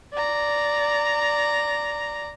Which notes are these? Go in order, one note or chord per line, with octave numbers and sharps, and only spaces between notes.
D5 A#5